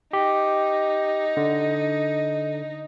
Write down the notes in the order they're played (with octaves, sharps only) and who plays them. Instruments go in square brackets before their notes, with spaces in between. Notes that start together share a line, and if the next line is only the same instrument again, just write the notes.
[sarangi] D#4 [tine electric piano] G4
[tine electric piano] D3